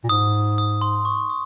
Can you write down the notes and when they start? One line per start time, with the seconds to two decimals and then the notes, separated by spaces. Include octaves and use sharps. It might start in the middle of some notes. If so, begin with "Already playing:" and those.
0.04 A#2
0.09 G#2 D#6
0.58 D#6
0.81 C6
1.05 C#6
1.30 D#6